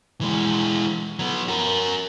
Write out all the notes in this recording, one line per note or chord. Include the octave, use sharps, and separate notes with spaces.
E3 G#3
F#3 B3
F#4 A#4